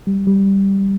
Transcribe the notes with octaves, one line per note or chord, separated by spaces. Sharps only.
G3
G3